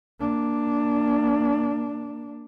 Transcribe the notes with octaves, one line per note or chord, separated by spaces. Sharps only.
A#3 D4